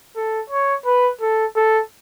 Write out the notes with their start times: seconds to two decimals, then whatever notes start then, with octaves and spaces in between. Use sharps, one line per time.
0.16 A4
0.50 C#5
0.85 B4
1.21 A4
1.56 A4